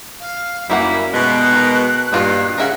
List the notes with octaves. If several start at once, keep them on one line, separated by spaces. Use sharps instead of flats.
F5
F#2 G3 A#3 E4 F#5 A#5
B2 G#3 F#6
D#3 A#4
G2 A#2 D#4 F4 F#4
C#3 A#4 E5 F#5